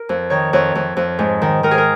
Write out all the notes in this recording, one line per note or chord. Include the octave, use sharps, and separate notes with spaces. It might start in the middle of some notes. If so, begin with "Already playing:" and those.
Already playing: A#4
F2
D#3 C#5
F2 C#5
F2
F2
G#2
D#3
D#3 A#4
G#4
A#4